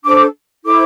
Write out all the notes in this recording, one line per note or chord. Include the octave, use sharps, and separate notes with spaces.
D4 A4 C5 D6
E4 A4 C5 D6